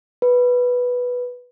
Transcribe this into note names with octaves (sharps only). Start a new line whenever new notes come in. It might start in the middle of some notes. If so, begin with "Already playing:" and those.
B4